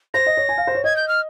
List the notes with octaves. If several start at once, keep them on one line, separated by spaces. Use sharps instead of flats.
C5 A#6
D#5
C#5
G#5
F5
C5
C#5
D#5 G#6
G6
F6